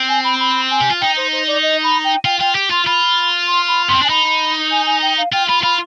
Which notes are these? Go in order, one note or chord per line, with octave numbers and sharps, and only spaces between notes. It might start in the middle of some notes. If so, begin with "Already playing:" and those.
Already playing: C4
G#5
B5
B5
G#5
G4
F4
D#4 G5
C5
C5
D5
D#5
B5
G5
F4 G5
F4 G5
G4
F4 C6
F4 B5
C6
B5
B3 C6
C4
D4 G#5
D#4 B5
G#5
G#5
G5
F5
F4 G5
F4 B5
F4 B5